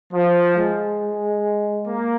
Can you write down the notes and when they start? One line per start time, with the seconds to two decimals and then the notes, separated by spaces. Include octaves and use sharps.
0.13 F3
0.57 G#3
1.87 A#3